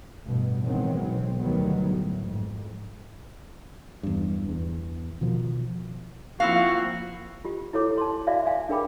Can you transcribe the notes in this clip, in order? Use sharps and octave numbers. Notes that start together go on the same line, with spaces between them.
A1 G2 B2
D#3 E3 F#3 G#3 B3 C4
B1 B2 C4
D2 D#3 F#3 G3 B3
A2
G#1 F2
E2 G2
E2
B2 D#3 F3
F3 A#3 C4 E4 F#4 F5
F4 G4
E4 F#4 A4 C#5 D6
A5 C6
F#4 D5 E5 F5 G#5
F5 G#5
D4 G#4 A#4 G5 B5 D6